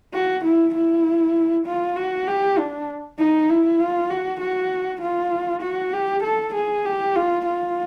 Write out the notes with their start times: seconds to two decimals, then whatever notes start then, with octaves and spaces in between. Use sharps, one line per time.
0.14 F#4
0.44 E4
0.75 E4
1.66 F4
1.97 F#4
2.27 G4
2.58 D4
3.19 D#4
3.50 E4
3.80 F4
4.10 F#4
4.40 F#4
5.02 F4
5.63 F#4
5.93 G4
6.23 A4
6.54 G#4
6.85 G4
7.16 F4
7.46 F4